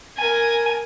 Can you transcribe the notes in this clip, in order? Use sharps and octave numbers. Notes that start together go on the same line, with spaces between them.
A#4 G#5